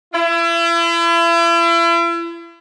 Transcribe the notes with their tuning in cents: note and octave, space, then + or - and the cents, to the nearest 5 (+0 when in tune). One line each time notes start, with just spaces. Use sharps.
E4 +40